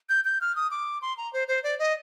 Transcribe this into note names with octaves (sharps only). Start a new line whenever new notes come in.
G6
G6
F6
D#6
D6
C6
A#5
C5
C5
D5
D#5